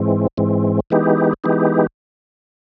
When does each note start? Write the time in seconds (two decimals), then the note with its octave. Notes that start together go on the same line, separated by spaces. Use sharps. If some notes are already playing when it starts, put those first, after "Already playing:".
Already playing: G#2 E3 G#3 C4
0.38 G#2 E3 G#3 C4
0.90 E3 G#3 B3 D#4 G4
1.44 E3 G#3 B3 D#4 G4